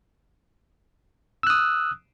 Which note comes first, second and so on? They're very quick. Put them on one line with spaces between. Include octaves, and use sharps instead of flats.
E6 F#6 D#6